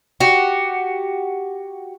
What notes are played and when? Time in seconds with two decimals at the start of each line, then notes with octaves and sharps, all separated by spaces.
0.20 F#4 G4